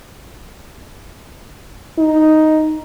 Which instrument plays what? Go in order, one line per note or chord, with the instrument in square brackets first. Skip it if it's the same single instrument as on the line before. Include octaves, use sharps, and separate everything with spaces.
[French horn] D#4